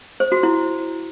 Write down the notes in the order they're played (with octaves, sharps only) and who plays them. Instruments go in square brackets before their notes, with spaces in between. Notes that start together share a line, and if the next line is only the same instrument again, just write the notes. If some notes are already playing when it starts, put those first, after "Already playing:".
[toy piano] C5
F#4
E4